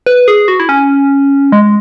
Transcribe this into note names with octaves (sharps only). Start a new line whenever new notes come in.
B4
G#4
F#4
E4
C#4
G#3